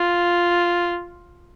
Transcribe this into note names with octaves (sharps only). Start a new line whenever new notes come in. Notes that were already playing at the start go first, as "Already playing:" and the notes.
Already playing: F4